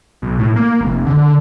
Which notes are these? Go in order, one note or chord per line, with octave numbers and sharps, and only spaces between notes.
B1
A2
A#3
F1
D3